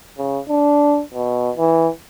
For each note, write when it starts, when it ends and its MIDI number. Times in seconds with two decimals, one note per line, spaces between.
0.18 0.39 49
0.49 1.02 62
1.14 1.51 47
1.57 1.89 52